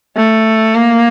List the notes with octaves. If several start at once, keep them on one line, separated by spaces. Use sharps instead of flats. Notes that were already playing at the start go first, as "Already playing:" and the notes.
A3
A#3